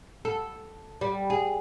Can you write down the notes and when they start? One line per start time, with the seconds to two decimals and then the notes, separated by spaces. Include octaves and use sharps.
0.25 A4
1.01 G3
1.30 G#4